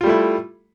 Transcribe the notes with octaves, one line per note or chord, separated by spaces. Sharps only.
G3 A3 E4 F4